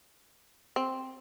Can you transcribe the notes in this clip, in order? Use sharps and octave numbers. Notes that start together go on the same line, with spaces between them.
C4